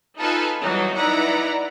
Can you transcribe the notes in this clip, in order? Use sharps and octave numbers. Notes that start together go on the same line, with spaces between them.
D#4 F4 A4 B4 G#5
E3 F#3 G3 D#4 F#4
D#4 E4 B4 D5 F#5 A#5